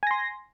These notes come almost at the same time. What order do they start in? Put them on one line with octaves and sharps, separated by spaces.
G#5 A#6 C6